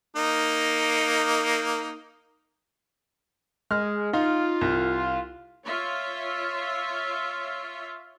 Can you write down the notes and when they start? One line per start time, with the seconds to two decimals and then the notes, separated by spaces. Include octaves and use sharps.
0.16 A#3 D#4
3.71 G#3 F6
4.13 D#4 F4
4.61 C2
5.66 F4 C#5 E5